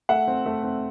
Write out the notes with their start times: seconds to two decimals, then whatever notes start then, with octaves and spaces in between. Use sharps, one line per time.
0.09 A3 E5 F#5
0.27 C4
0.46 A3
0.63 C4